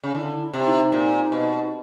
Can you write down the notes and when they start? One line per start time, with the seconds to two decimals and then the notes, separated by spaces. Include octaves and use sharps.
0.04 C#3
0.15 D3 E4
0.41 E4
0.53 C3
0.67 D#4
0.92 A#2
1.32 B2